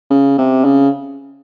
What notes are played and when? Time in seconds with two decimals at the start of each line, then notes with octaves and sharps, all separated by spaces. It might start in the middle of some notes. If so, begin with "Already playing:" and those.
0.10 C#3
0.38 C3
0.64 C#3